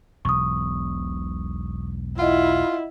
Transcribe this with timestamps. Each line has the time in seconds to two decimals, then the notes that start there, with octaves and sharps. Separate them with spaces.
0.25 E1 B1 C#6 D#6
2.19 E4 F4 D#5 F#5